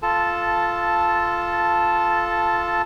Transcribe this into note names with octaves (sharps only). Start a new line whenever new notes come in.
F4 A4 A5